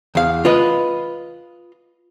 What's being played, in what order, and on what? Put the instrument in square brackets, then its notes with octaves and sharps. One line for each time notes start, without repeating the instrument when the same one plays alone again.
[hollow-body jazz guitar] E2 F5
F4 B4 D#5